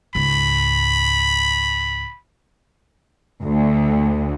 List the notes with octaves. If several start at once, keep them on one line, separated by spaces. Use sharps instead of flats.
C#2 G#2 B5
D2